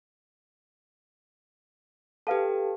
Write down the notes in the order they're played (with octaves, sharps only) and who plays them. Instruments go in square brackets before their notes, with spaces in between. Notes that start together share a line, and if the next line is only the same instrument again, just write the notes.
[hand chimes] G4 A4 [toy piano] B4 F5 A5